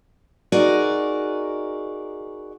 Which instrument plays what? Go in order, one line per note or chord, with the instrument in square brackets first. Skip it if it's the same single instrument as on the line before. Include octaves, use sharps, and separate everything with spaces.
[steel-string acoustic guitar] D#4 F#4 G#4 A#4 D5 D#5